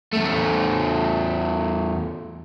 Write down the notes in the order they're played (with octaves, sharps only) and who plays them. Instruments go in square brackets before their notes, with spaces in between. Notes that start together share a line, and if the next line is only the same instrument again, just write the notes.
[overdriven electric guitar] E2 A3